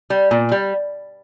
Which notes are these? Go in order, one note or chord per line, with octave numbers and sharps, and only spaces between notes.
G3
A#2
G3